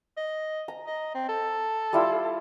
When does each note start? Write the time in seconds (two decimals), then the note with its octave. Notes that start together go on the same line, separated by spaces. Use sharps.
0.17 D#5
0.68 A#5
0.87 D#5
1.14 C4
1.28 A4
1.93 G3 E4 F4